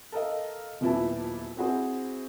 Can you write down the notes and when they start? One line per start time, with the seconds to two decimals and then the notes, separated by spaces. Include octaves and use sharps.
0.12 A4 A#4 D#5 F5
0.81 D#1 B1 A#2 E4 B4 A5
1.57 C4 E4 F#4 G#4 C5